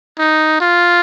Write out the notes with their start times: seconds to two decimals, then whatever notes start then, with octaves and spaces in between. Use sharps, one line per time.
0.19 D#4
0.60 F4